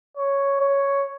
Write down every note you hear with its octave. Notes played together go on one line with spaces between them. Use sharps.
C#5
C#5